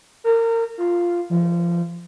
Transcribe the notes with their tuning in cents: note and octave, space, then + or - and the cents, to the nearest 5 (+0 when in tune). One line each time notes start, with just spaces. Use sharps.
A#4 -30
F4 -5
F3 -25